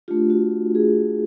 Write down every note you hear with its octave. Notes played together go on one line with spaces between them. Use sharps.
A3 D4 F4 G4
F#4
G#4